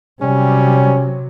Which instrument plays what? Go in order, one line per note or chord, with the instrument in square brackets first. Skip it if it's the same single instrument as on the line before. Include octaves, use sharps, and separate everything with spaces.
[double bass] C3 F#3 [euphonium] G3 [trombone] C#4